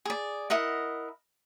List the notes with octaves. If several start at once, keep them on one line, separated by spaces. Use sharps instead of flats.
G#4 D5
E4 A#4 D#5 F#5